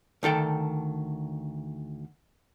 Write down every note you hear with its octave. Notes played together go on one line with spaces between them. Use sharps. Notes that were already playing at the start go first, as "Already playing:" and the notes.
D2 D#3 A4 G5